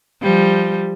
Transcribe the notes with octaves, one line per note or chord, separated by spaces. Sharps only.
F3 G3